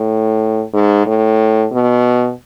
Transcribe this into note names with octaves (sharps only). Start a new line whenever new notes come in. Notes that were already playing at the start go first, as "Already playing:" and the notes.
Already playing: A2
G#2
A2
B2